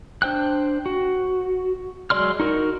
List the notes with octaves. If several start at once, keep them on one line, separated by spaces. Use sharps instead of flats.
D4 C5 G5 F#6
F#4
F#3 G#3 D5 C6 F6
D#4 F#4 A#4